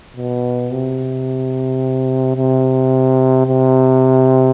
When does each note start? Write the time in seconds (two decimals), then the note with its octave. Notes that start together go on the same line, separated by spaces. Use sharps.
0.17 B2
0.72 C3
2.37 C3
3.47 C3